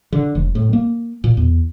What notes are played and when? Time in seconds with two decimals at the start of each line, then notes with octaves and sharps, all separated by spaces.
0.12 D3
0.35 F1
0.55 A2
0.73 A#3
1.24 A#2
1.37 E2